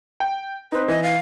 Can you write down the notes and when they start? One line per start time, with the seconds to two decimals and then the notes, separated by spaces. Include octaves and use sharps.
0.20 G5
0.72 C4 D#4 B4
0.88 E3 D#5
1.03 F5